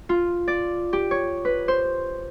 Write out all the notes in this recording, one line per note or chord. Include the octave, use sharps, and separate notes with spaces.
F4
D5
G4
C#5
B4
C5